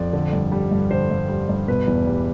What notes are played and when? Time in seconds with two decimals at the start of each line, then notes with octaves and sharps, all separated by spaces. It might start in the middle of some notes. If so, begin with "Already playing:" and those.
Already playing: F2 D5
0.13 D3
0.33 G2
0.52 G3
0.71 G2
0.91 D3 C5
1.10 G2
1.29 G3
1.49 G2
1.68 B2 B4
1.88 E2
2.07 G3